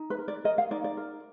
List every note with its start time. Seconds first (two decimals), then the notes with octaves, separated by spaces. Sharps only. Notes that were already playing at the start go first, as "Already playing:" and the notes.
Already playing: D#4
0.10 B4
0.19 A#4
0.28 D5
0.44 A#4 D#5
0.58 F5
0.71 D#4 D5
0.84 D5
0.97 A#4